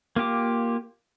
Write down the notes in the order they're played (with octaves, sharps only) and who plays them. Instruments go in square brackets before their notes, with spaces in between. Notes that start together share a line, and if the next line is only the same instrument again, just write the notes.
[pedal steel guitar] A#3 F4 G4 D6